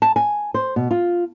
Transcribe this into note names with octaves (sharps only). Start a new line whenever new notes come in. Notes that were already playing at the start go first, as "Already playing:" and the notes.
A5
G#5
C5
B2
F4